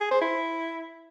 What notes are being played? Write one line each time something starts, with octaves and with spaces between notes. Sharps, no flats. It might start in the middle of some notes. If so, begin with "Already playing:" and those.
G#4
C5
E4